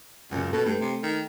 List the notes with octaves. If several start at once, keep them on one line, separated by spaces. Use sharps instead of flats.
C#2 F#2 C#3
B2 A4
G2 A3
C3
D#3